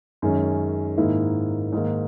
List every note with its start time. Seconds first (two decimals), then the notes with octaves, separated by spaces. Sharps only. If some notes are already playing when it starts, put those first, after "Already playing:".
0.22 F#2 D#3 G#3 C#4
0.97 G#2 D#3 A#3 E4
1.72 G#2 D#3 A#3